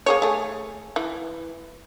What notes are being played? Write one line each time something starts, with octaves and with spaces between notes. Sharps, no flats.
A#3 G#4 C#5
A3 G#4
E3